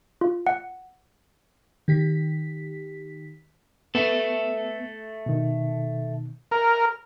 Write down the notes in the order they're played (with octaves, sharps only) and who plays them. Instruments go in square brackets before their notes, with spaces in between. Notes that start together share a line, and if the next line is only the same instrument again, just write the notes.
[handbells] F4
F#5
[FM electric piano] D#3 G4 B6
[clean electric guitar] A3 A4 [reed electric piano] B3
[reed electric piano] B2 D#3
[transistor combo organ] A#4